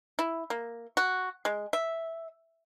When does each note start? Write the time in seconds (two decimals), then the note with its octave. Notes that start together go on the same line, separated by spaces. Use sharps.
0.19 E4
0.50 A#3
0.97 F#4
1.45 G#3
1.73 E5